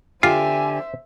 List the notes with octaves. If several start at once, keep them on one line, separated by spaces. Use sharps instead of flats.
D3 F4 G4 C5 E5 G#5